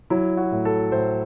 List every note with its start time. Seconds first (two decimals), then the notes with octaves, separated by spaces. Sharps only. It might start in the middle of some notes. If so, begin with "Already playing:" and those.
0.10 F#3 E4
0.37 F#4
0.51 A2
0.65 A4
0.92 A2 C5